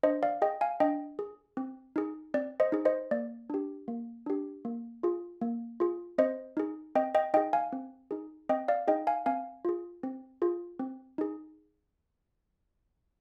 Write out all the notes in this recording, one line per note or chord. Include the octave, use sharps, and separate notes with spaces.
D4 C5 D#5
D5 F5
G#4 D#5 G5
F5 G#5
D4 D#5 G5
G#4
C4
D#4 G#4
C4 D5
C5 D#5
D#4 G#4
C5 D#5
A#3 D5
D4 G4
A#3
D4 G4
A#3
F4 G#4
A#3
F4 G#4
C4 C5 D#5
D#4 G#4
C4 D#5 G5
D#5 G5
D#4 G#4 D#5 G5
F5 G#5
C4
D#4 G#4
C4 D#5 G5
D5 F5
D#4 G#4 D#5 G5
F5 G#5
C4 F5 G#5
F4 G#4
C4
F4 G#4
C4
D#4 G#4